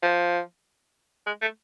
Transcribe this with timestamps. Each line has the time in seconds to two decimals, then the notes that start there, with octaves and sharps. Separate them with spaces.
0.03 F3
1.27 G#3
1.42 A3